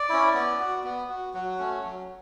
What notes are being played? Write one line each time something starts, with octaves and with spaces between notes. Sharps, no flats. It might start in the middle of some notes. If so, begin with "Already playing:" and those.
Already playing: D5
C#4 E4
B3
F#4
B3
F#4
F#3 F#4
A3 C#4
F#3